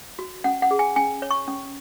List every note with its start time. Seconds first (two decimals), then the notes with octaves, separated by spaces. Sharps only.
0.19 F#4
0.44 C#4 F#5
0.62 F#5
0.71 G#4
0.79 G#5
0.96 C#4 G#5
1.22 C#5
1.31 C#6
1.48 C#4